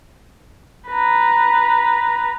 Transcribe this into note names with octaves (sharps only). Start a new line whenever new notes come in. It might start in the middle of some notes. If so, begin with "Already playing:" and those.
B4 A#5